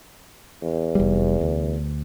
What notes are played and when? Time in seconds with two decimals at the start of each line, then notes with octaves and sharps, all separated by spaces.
0.62 E2
0.95 F1 G3
1.41 D2